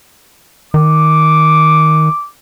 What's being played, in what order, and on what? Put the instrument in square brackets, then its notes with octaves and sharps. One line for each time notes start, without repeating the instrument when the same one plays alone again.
[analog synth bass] D#3 [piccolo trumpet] D6